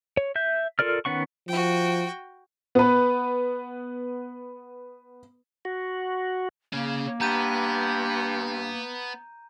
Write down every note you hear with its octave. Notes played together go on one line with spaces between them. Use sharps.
C#5
E5 G6
F4 A4 A#4 D5 F6
D#3 B3 C#4 F#5 C#6
F3 F#4 G5
B3 B4
F#4
C#3 A#3 C#4
G2 B3 A#5 G6 D#7